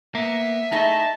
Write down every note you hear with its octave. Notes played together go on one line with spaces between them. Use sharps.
A#3 B3 E5
A3 D#4 E4 G#4 D#5 A5